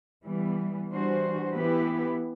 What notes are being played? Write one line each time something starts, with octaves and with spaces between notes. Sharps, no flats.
E3 G3 B3
E3 G3 D4 F#4 C5
E3 B3 E4 G4 B4